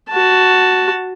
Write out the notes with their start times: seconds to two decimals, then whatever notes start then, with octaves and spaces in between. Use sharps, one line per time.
0.10 F#4 A5